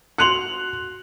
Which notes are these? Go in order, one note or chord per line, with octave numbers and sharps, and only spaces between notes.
F#4 C6 F#6 C#7 F7 F#7